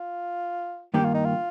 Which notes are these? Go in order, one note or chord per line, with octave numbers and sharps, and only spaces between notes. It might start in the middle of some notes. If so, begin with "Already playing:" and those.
Already playing: F4
G2 D#3 A#3 G4
F4
D#4
F4